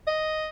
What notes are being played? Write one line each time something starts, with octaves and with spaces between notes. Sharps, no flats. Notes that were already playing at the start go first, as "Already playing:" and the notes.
D#5